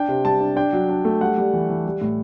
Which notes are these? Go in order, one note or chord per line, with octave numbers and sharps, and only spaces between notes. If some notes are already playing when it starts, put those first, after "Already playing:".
Already playing: D4 G5
C3
G3 A5
D4
D4 G5
F#3
D4
A3
G3 F#5
G3
E3
E3
G3
A2